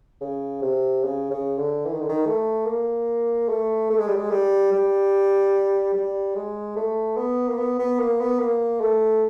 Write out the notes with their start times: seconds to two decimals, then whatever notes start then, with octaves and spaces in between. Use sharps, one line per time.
0.21 C#3
0.62 C3
1.03 C#3
1.31 C#3
1.58 D3
1.85 E3
1.93 D#3
2.01 D3
2.09 D#3
2.26 A3
2.66 A#3
3.49 A3
3.90 A3
3.98 G#3
4.08 G3
4.16 G#3
4.30 G3
4.72 G3
5.94 G3
6.35 G#3
6.76 A3
7.17 B3
7.48 A#3
7.58 B3
7.79 B3
7.99 A#3
8.20 B3
8.39 A#3
8.81 A3